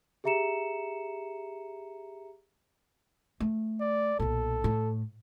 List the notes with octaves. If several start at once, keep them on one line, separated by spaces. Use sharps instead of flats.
G4 G#4 E5 A#5 C#7 E7
A3
D5
B1 A#2 A4
A2